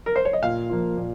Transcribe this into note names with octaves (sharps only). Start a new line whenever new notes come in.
A#4
C5
C#5
D#5
A#2 F5
F3 A#3 F4
A#2